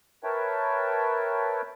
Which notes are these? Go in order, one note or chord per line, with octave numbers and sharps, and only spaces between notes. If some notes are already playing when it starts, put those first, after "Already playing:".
A#4 B4 C#5 E5 G5 A5